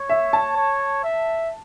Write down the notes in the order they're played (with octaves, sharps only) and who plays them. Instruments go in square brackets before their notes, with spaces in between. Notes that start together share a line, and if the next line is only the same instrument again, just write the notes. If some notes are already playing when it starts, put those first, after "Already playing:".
Already playing: [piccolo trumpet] C#5
[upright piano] E5
A5
[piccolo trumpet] C#5
E5